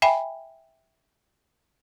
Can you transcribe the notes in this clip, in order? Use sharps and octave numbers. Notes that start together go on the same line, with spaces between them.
E5 G5 G#5 B5